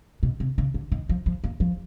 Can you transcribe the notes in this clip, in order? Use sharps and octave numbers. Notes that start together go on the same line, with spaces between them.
B2
C3
C#3
D3
D#3
F3
F3
A#3
F3